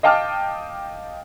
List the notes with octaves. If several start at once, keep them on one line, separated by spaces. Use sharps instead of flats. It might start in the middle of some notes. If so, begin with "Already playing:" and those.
D#5 F5 G5 A5 D6 F6